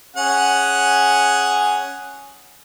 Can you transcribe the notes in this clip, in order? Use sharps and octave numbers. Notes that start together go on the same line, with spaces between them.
C#4 G#4 F#5